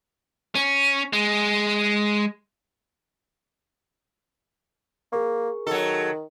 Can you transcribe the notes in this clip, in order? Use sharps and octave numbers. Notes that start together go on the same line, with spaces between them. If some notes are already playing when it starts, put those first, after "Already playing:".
C#4
G#3
A#3 G#4 A#4 C#6
D#3 F#3 A4